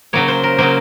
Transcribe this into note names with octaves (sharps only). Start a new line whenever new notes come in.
C#3 F#3 A#3 C#5
C5
A#4
C#3 F#3 A#3 C5